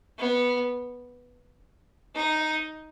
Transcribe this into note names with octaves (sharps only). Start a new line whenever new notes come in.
B3
D#4